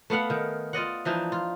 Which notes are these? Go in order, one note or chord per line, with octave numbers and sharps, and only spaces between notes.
A3 B3 F5 F#5
D#3
F4 D5 D#5 F#5
E3 F3 D4 D#4
F4